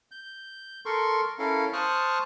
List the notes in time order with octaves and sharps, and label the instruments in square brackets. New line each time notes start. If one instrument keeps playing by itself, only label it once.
[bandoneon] G6
A4 A#4 C6 C#6
C#4 E4 A4 A#4 F5
C5 A5 C#6 D#6 F6 F#6